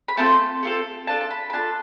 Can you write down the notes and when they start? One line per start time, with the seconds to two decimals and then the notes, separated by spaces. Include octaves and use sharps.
0.08 B5
0.17 A3 C4 F4 A4 A5
0.63 A3 C4 F4 A4
1.07 D4 F4 A4 A5
1.21 A5
1.31 B5
1.50 B5
1.53 D4 F4 A4 A5